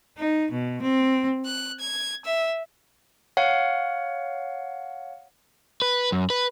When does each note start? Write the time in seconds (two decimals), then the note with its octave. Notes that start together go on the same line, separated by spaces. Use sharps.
0.16 D#4
0.51 B2
0.82 C4
1.45 F#6
1.80 G#6
2.24 E5
3.37 C#5 F5 F#5
5.82 B4
6.12 F#2
6.30 B4